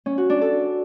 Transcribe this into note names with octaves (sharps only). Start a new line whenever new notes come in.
C#4
F#4
D4
A4